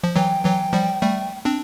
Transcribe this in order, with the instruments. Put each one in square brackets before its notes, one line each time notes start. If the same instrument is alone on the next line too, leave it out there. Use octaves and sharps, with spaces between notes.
[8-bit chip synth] F3
[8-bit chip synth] E3 F#3 [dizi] G5
[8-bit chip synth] E3 F#3
F3 G3
G3 A3
C4 D4